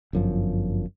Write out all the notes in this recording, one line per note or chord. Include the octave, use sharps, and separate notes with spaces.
G1 F#2 F3